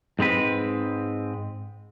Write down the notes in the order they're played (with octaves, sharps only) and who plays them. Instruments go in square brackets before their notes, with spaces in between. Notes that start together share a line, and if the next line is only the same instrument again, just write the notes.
[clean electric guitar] G#2 G#3 C4 B4